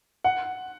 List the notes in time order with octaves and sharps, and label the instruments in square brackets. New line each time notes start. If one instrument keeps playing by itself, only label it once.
[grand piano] F#5